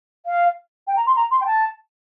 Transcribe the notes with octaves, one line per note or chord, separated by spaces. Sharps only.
F5
G5
A#5
C6
A#5
C6
G5
A5